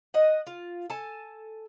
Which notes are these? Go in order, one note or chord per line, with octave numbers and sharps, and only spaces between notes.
D#5 F#5
F4
A4 G#5 A5